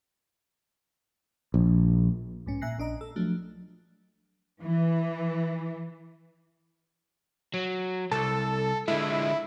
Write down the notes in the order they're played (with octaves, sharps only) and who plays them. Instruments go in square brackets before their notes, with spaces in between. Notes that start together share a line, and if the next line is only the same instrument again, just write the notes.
[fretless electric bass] A#1
[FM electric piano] B1 G#2 C#4
A#2 E5 G#5 F#6 A#6 C7
A#1 D4 D#5 A#5
A4 E6
F3 F#3 A3 D4
[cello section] E3
[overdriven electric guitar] F#3
[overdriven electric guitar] C2 [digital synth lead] A4
[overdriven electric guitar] D3 G#3 [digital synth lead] E4